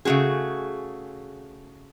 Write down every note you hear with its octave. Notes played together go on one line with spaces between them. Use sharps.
C#3 A3 B3 F#4 G#4